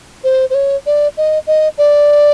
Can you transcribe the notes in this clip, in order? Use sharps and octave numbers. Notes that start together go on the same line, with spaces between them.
C5
C5
C#5
D5
D#5
D#5
D5